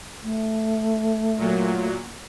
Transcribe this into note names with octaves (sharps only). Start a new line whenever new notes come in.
A3
A#2 F#3